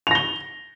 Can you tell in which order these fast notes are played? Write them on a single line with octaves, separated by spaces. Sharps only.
F7 A#6 G7